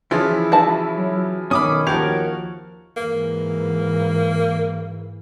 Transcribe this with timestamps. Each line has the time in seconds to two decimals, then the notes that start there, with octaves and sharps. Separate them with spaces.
0.11 C#3 E3 F3 E4 F4
0.52 F#4 A5
0.98 F#3
1.51 B1 D#3 C#4 B5 D6 D#6
1.87 D#2 F3 F#4 G4 A#4 C#5 F5 F7
2.97 G#2 E3 A#3